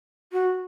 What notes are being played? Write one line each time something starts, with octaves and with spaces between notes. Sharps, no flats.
F#4